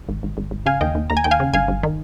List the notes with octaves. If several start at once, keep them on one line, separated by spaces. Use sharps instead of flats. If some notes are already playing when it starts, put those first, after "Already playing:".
G#1
G#1
G#1
G#1
C#3 F5 G#5
D#2 D#5 G5
D#2
D#2 A#5
G#5
D#2 G5
F5 G#5
C#3
G1 F5 G#5
G1
D#3